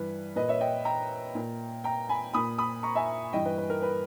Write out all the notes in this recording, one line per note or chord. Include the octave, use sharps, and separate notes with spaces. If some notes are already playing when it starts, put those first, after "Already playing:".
Already playing: G2 E3 B4
A#2 B4 D#5
C#5 E5
D#5 G5
G5 A#5
A#2
G5 A#5
G#5 B5
A#2 B5 D#6
B5 D#6
A#5 C#6
E5 G#5
G2 E3 D#5 G5
B4 D#5
B4
A#4
B4